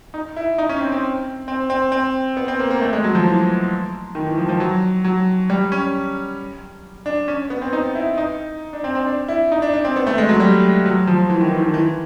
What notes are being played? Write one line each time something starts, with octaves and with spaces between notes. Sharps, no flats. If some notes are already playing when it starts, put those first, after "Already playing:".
D#4
E4
D#4
C#4
C4
C4
C4
C4
C4
B3
C4
A#3
A#3
A3
G#3
F#3
F3
E3
D#3
E3
F3
F3
F#3
F#3
G3
C#4
D4
C#4
B3
C4
D#4
E4
D#4
D4
C4
C4
D4
E4
D#4
D4
D4
C4
B3
A3
G#3
F#3
G3
F#3
F3
E3
D#3
E3
D#3
E3